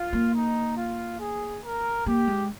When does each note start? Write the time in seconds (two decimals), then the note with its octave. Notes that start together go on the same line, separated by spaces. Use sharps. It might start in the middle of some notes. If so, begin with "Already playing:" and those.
Already playing: F4
0.13 A#3
0.34 D#4
0.77 F4
1.20 G#4
1.64 A#4
2.06 A#3 G4
2.27 G#3